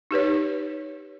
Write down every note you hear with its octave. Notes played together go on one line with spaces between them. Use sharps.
D#4 G4 B4 C#5